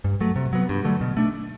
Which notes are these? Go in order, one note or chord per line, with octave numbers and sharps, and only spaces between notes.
G2
F#3 A3
C3
F#3 B3
G2
D3 F#3 A3
B2
A3 D4